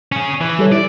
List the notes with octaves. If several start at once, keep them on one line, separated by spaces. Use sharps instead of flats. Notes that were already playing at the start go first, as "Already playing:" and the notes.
C#4 G#4
E3
G3 A4 C#5
E4 D5